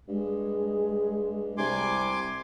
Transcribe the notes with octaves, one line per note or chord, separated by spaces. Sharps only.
G2 G#3
C2 G#5 C6 D6